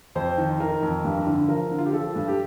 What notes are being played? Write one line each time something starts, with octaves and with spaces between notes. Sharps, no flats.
F2 C5
D#3
D#3 A#4
F2
G2
D3
F3 A#4
D3
F4
G4
F3 A4
G2
G4